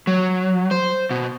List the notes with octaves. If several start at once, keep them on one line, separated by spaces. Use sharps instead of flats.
F#3
C5
B2